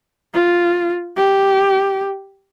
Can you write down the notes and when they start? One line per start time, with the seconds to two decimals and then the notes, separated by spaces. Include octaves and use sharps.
0.34 F4
1.17 G4